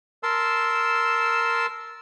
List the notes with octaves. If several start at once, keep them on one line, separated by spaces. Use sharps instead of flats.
A#4 A5 C6 E6